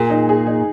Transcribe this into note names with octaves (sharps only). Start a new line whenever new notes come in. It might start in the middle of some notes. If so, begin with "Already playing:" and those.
Already playing: A#2 G#4
D#4
G#4
D#4